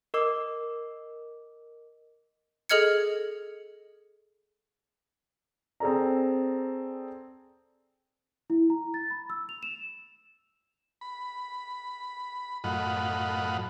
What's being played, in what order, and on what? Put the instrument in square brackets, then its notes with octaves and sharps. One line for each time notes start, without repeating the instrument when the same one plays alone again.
[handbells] A#4 D#5 D6 E6
[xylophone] G#4 A4 D#5 F6 G#6 C#7
[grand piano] C4 G#4 A4 D5 A#5
[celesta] E4
A#5
A6
B5
E6
F7
E7
[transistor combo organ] B5
F#2 A2 F4 D#5 F#5 B5